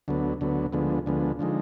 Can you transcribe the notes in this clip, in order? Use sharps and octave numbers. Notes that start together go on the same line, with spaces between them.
D2 D3 F#3 B3
D2 D3 F#3 B3
D2 D3 F3 G#3 B3
D2 D3 F3 G#3 B3
D3 F3 G#3 D#4